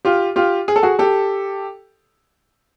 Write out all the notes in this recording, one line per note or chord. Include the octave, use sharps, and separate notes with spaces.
F4 G4
F4 G4
G#4
A4
F#4 G#4
G4 A4